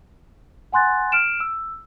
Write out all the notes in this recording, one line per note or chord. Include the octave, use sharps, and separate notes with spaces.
F#5 G#5 C6 F#6 A6
F6 D7 E7
E6